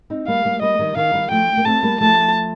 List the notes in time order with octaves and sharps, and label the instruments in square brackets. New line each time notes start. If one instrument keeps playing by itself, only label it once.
[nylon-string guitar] C4 D#4
[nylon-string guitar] G3 A#3 [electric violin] F5
[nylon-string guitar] G3 A#3
[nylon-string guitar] G3 A#3 [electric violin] D#5
[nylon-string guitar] D#3 G3
[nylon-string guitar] D#3 [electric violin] F5
[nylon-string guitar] D#3 G3
[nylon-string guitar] F3 A3 [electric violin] G5
[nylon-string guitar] A#3
[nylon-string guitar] A3 C4 [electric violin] A5
[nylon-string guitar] G3 A#3
[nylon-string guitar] F3 A3 [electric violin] A5